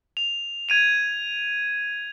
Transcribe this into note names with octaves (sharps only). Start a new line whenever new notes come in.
F7
G#6 D#7 F7